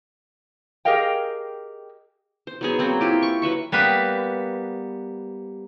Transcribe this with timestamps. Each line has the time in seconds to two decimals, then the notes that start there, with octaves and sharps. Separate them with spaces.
0.85 G4 G#4 A#4 D#5 F5 G5
2.47 C5
2.61 F#3 B3 G#4
2.79 F#3 A#3 C4
3.01 E4 F4 G4
3.22 C#6
3.42 F#3 B4 E5 C#6
3.72 G3 A#3 B3 B4